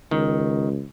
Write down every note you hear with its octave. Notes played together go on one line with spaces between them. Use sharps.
C#2 D#3